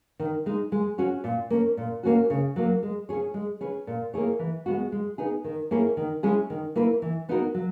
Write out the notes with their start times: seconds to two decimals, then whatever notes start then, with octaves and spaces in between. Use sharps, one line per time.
0.20 D#3
0.46 G#3 D#4
0.72 G#3
0.98 C#4 F#4 C#5
1.24 A#2
1.50 A#3 C#4
1.77 A#2
2.03 A#3 C#4 F#4
2.30 C#3
2.56 F#3 A#3
2.83 G#3
3.09 C#4 G#4 C#5
3.34 G#3
3.61 C#4 G#4 B4
3.87 A#2
4.14 A#3 E4 G#4 C#5
4.39 E3
4.66 G#3 B3 F#4
4.92 G#3
5.18 B3 D#4 G#4
5.44 D#3
5.71 A#3 C#4 E4 G#4
5.97 D#3
6.23 G#3 C#4 E4 G#4
6.50 D#3
6.76 A#3 E4 B4
7.02 E3
7.29 B3 D#4 F#4 A#4
7.54 F#3